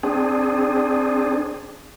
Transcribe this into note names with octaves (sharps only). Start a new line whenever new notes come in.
C4 D4 G#4